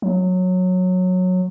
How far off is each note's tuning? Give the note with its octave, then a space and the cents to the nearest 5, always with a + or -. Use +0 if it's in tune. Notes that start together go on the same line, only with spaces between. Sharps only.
F#3 -15